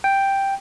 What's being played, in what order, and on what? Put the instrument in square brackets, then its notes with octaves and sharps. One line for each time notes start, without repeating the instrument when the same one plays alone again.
[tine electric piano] G5